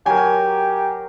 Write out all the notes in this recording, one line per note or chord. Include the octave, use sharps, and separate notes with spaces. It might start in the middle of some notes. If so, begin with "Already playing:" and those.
F#3 G4 A#4 G#5